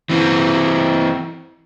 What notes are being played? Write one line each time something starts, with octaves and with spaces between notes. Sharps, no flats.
E3 C4